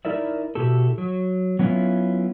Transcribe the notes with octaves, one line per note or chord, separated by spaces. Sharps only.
D#4 E4 A#4 D5 E5
B2 E4 F#4 G4 A4
F#3
F#3 B3 C#4 E4 F4